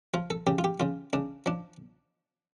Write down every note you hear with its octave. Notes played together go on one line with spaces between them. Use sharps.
F3 F4
A4
C#3 G4
F4
G4
C#3 F4
C#3 D4
F3 D4